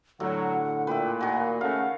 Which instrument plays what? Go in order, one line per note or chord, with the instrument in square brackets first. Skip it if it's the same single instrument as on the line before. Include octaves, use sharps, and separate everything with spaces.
[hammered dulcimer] A2 [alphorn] D3 [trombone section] F#3 [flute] F#5
[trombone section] A#2 [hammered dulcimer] B4 E5 [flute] G5
[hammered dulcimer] D#3 F#4 [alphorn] A#3 [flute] G#5
[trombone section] C#3 A3 [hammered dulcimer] F5 [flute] F#5